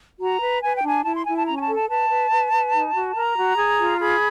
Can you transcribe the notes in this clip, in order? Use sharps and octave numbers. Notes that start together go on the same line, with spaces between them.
F#4 A#5
B4
B4 G#5
G5
D4 G#5
E4 A5
C6
E4 G#5
A5
C#4 A#5
G#5
A5
A4
A5
B4 A5
B4
B4
B4
D#4
F#4
A#4 A#5
F#4
G#4
F4
G#4 B5